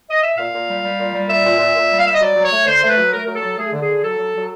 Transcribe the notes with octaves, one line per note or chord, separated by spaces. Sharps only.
D#5
E5
A#2 F5
A#2
G3
G3
A#2
G3
A#2 E5
A#2
A#2
A#2
G3
F5
G3 E5
D#5
F#3 D5
F#3
C#5
A3
D3 C5
A3
B4
F#3
A3 A#4
F#3 A#4
A4
F#3
A3 G#4
D3
G#4
D3
F#3 A4
F#3
F#3